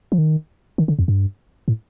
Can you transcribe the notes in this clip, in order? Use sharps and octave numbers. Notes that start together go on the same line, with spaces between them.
F3
D#3
D#3
D3
F2
G2
A2